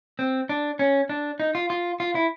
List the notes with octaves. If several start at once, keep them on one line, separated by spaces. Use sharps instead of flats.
C4
D4
C#4
D4
D#4
F4
F4
F4
E4